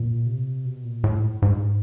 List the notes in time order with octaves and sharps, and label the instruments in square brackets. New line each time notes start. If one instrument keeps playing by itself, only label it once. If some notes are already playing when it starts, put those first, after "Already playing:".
Already playing: [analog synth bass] A#2
C3
B2
A#2
A2
G#2